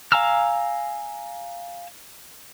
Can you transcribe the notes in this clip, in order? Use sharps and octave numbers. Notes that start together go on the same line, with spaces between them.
F5 G#5 A#5 E6 F6